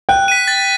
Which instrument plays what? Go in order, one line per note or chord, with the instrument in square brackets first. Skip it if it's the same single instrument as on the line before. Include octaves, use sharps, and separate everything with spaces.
[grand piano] G5 [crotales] F#6
[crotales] B6 D#7
A6